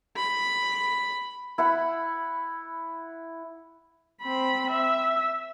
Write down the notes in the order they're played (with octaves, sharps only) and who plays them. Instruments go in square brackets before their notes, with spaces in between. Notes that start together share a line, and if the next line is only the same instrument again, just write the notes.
[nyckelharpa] B5
[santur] E4 F#5 B5
[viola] C4 B5
E5